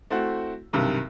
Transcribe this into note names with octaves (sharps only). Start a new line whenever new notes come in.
A3 C4 E4 F#4
B1 G2 C3 D#3